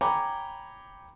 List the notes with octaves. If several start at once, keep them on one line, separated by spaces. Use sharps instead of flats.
C#5 G5 G#5 A#5 B5 D6